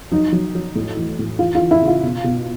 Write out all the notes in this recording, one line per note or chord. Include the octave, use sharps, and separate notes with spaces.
F#3 D#4
F#3
F#3
A2
E3
A2
E3 F4
F4
E3
E4
C#3
F4
B2
B2